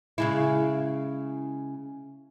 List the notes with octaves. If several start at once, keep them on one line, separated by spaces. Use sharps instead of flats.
C#3 G#3 E4